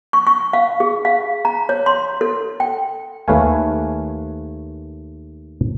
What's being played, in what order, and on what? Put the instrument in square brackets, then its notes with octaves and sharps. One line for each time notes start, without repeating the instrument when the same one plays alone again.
[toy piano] C#6
C#6
F5
G#4
F5
A#5
C#5
C6
A4
G5
[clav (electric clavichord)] D#2 A3 B4 C#5 F5 G#5